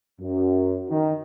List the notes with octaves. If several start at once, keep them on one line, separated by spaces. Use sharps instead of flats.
F#2
D#3